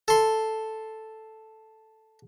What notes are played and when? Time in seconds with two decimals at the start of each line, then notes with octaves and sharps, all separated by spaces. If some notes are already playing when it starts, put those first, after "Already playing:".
0.08 A4 C6